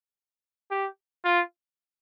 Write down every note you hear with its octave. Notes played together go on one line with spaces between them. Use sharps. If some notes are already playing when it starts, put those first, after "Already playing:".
G4
F4